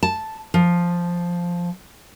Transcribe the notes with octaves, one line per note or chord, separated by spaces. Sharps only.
A5
F3